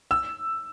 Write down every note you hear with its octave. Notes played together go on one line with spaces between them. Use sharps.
E6